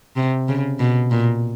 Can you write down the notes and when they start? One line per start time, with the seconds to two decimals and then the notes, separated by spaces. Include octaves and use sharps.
0.16 C3
0.48 C#3
0.79 B2
1.11 A#2